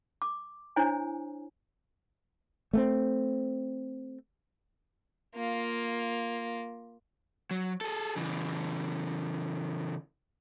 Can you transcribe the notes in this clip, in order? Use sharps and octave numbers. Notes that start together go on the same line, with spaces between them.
D6
D4 E4 C5 C#5 G#5
A3 A#3 C4
A#3 F4
F#3
G#4 A4
C#3 E3